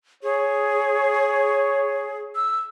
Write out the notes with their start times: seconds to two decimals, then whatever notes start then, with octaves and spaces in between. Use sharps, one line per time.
0.23 G#4 C#5
2.35 E6